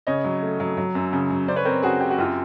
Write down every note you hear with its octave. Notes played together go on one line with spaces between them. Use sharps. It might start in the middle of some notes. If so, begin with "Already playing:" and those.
C#3 C#5 D#5
F#3
A3
F#3
F#3
F#2
C#3
F#3
C#3 C5 D5
B4 C#5
C4 A#4 C5
C#3 F#4 G#4
C4 G4
F#4
F#2 F4 G4